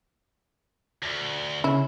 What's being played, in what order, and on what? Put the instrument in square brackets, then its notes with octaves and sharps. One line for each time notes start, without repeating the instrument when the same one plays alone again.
[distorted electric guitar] D2
[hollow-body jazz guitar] C#3 [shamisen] E4